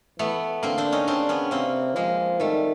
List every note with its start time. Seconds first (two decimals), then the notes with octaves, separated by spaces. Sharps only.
0.19 E3 A3 B3
0.63 D3 A#3 C4
0.78 C4 D4
0.92 C#4 D#4
1.08 C#3 C4 D4
1.29 B3 C#4
1.51 C3 A#3 C4
1.95 F3 G#3 A#3
2.40 D#3 G3 A3